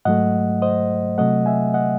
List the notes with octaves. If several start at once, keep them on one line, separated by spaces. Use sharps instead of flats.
G#2 F#3 A3 D#5 F#5
C5 D#5
C3 F#3 A3 D#5 F#5
E5 G#5
D#5 F#5